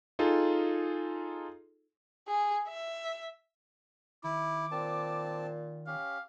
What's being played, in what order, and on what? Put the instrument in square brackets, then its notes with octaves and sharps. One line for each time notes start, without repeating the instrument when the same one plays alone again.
[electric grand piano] D#4 F4 G#4 A4
[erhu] G#4
E5
[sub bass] D#3 [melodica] E4 [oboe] D6
[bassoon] A#2 [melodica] C4 A5
[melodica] C#4 G4 [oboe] F5